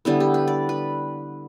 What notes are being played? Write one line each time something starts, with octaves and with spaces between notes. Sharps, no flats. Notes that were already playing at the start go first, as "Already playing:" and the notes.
D3 G3 B3 E4
G4
B4
D5
B4